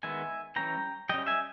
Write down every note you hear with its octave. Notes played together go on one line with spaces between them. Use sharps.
D#3 G#3 B3 E5 G#5
E3 G3 C#4 G5 A#5
G3 C#4 D#5 G5
E5 G#5